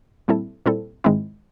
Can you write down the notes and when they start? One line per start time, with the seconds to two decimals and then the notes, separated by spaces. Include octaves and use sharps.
0.28 A#2 G3 C4 E4 A4
0.66 A#2 G3 C4 E4 A4
1.04 G#2 D#3 G#3 C4 E4